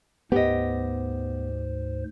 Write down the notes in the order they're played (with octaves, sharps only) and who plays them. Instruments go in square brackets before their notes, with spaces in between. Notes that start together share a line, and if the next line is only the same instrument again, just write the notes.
[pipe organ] D2 G#2 C5 [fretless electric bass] B3 [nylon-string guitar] G4 D#5